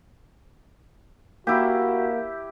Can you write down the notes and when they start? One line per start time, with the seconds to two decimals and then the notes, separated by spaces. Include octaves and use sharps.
1.47 A#3 E4 F#4 G4